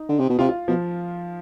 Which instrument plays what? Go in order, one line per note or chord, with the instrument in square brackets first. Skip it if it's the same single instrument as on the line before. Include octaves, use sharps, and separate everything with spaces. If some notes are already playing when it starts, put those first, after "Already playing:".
Already playing: [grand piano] D#4
[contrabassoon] D3
C3
B2
[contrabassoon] C3 [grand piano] F4
[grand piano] F4
[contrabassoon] B2 [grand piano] F3